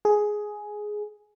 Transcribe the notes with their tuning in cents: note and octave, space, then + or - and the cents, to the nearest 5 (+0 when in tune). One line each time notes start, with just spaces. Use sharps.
G#4 +5